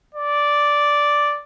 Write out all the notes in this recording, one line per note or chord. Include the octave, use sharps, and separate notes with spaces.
D5